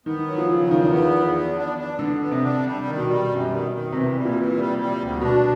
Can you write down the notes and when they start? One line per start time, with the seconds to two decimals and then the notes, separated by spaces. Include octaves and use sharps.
0.06 D#3 B3
0.27 F#3
0.38 F3
0.49 C#3
0.70 E2 D#3
0.92 B3
1.13 E2
1.35 B3
1.56 D4
1.78 D4
1.99 D3 B3
2.21 B3
2.31 C3
2.42 D4
2.64 G3
2.85 D#3
2.97 B2
3.07 G3
3.28 F#2
3.50 D#3
3.71 D#3
3.92 C3 E3
4.14 G3
4.25 A#2
4.36 E3
4.57 G3
4.79 G3
5.01 D2
5.21 B2 D4